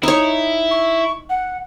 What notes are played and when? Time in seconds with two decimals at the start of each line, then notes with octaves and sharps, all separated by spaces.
0.03 D#4 E4 C#5
0.71 C#6
1.29 F#5